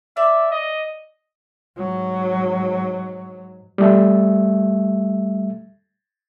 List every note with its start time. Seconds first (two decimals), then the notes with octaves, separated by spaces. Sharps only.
0.17 D5 E5
0.52 D#5
1.77 G#2 F#3
3.78 G3 A3 E5